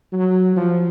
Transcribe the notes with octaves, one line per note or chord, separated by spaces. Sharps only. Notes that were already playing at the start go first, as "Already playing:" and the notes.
F#3
F3